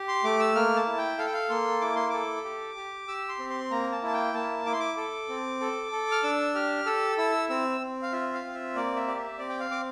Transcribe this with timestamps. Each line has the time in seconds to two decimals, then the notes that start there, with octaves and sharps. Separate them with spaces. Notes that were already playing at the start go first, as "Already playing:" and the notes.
Already playing: G4
0.08 C6
0.24 A3 D6
0.40 E6
0.55 A#3 F6
0.76 A5
0.87 E4
0.98 G5
1.18 A4 F5
1.26 G5
1.33 F5
1.50 A#3 C6
1.81 E4 D6
1.96 C6
2.09 A4 D6
2.45 G4
2.77 G4
3.08 G4 E6
3.29 C6
3.39 C4
3.50 C6
3.71 A#3 A#5
3.92 A5
4.02 E4 A5
4.13 G5
4.34 A#3 A5
4.66 E4 D6
4.72 C6
4.79 D6
4.97 A4
5.29 C4
5.60 A4
5.92 A4
6.12 F6
6.23 D4 E6
6.55 G4 F6
6.86 A4 E6
7.18 E4 E6
7.49 C4 E6
7.81 C4
8.02 F5
8.13 F4 E5
8.33 F5
8.45 C4
8.54 E5
8.75 A#3 D5
8.96 E5
9.07 G4 D5
9.18 E5
9.39 C4 D5
9.50 G5
9.60 F5
9.70 C4 D6